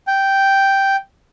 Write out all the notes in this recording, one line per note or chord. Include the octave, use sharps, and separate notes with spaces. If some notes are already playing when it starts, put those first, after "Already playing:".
G5